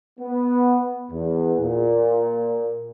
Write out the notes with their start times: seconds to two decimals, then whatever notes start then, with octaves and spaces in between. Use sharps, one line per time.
0.20 B3
1.12 E2
1.60 A#2